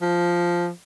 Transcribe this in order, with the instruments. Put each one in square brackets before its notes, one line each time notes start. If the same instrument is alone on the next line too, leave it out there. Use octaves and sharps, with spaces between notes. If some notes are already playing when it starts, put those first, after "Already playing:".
[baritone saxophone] F3